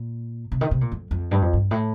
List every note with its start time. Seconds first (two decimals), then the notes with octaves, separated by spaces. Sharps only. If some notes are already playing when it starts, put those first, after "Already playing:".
Already playing: A#2
0.52 C3
0.61 D#3
0.71 C3
0.81 A#2
0.92 F2
1.11 F2
1.31 G2
1.42 F2
1.53 G2
1.71 A2